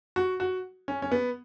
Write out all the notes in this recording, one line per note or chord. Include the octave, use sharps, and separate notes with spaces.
F#4
F#4
C#4
C#4
B3